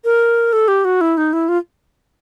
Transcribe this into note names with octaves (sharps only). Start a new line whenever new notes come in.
A#4
A4
G4
F#4
E4
D#4
E4
F4